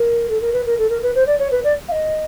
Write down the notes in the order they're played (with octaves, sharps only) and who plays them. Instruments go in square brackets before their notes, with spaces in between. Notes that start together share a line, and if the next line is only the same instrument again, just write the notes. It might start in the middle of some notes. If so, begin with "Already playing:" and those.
Already playing: [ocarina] A#4
A4
A#4
B4
A#4
A4
A#4
B4
C5
D5
C#5
B4
D5
F5
D#5